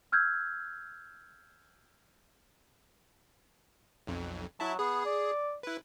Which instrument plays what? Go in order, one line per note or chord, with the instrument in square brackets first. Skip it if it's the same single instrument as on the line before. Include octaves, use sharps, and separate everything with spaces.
[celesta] E6 F6 G6 G#6
[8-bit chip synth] B1 F2
[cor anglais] F#3 [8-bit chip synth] E4 E5 A5
[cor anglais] B3 [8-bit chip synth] G#4
[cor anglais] D5
[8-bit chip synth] E4 B4